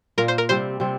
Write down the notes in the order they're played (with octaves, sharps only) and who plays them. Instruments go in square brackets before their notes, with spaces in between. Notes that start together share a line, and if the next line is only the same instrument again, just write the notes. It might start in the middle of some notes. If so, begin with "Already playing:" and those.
[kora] A#2 A#3 F4 [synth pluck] A#4
[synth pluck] C5
A#4
[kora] C3 G3 C4 [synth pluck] C5
[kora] C3 G3 C4